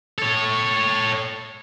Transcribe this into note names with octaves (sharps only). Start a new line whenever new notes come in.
A4 C#5